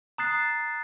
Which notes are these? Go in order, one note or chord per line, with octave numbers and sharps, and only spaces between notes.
A#5 D#6 F#6 A6 C7